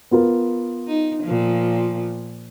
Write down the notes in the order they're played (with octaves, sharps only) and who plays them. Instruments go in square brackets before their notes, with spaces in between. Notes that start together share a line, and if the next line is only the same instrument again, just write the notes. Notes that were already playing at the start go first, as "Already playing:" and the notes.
[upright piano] B3 F4 A#4
[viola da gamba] D#4
A#2 F3